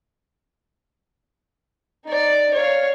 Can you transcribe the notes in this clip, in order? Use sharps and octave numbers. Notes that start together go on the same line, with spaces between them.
D#4 D5
C#5 F5